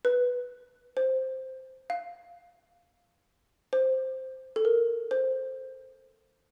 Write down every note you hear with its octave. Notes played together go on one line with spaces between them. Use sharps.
B4
C5
F5
C5
A4
A#4
C5